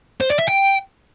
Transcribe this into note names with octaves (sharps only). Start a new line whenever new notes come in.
C5
D5
E5
G5